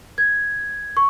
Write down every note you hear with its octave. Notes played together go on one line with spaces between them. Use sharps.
G#6
C#6